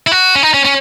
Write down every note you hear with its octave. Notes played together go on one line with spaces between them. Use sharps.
E4
F#4
C#4
D#4
C#4
C#4